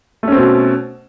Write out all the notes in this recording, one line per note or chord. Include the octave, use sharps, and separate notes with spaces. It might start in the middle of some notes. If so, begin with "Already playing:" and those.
B2 A3 C4 C#4